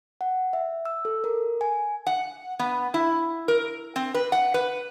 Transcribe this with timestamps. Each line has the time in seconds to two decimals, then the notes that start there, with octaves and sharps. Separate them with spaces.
0.21 F#5
0.53 E5
0.85 E6
1.05 A4
1.24 A#4
1.61 G#5
2.07 F#5
2.59 B3
2.94 E4
3.48 A#4
3.96 C4
4.14 B4
4.32 F#5
4.54 B4